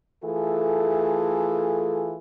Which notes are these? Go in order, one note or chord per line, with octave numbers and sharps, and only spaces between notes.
E3 A3 F4 G#4 A4